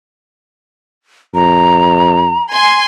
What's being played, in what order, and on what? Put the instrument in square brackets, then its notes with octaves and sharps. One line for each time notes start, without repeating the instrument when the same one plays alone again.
[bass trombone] F2 [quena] A#5
[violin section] G#5 C6